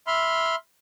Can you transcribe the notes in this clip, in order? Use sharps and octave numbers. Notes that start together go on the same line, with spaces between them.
E5 B5 C6 F6